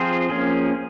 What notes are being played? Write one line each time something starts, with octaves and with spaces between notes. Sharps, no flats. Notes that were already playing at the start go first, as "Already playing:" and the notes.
Already playing: F3 C4 F4 G#4 C5
F3 A#3 C#4 G#4